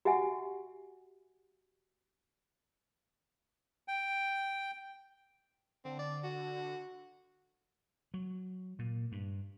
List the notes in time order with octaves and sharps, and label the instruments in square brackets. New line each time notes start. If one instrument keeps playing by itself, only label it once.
[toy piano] F#4 G4 E5 F#5 G#5
[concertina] G5
[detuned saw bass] D3 [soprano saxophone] C4
[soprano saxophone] D5
F#4
[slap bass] F#3
A#2
G2